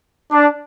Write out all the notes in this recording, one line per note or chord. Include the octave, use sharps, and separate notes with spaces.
D4